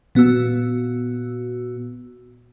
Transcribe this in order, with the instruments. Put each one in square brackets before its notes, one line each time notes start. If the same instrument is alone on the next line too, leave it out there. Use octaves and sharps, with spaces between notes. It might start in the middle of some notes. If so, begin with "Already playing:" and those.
[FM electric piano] A#2 B3 F#4 E6